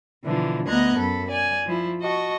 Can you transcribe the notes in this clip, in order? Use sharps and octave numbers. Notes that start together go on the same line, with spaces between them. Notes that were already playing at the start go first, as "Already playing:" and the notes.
B2 D3 E3 F3 D4
D2 B3 D#5 A#5 F#6 G#6
F#2 A4 B5
D5 G#5
F3 E4
F#4 D#5 A5 C#6